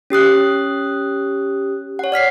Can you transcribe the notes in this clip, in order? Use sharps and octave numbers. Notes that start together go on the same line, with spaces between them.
C#4 G4 D#6 F#6
C#5 F#5
D5 F6 B6 C7